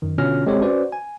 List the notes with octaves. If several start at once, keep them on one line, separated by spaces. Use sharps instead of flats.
F#2 D#3
B2 D3 C#4 F4 F6 A#6
G#3 C4 G4 A4 C#5
C#4 F#4 B4 C5 D5
G#5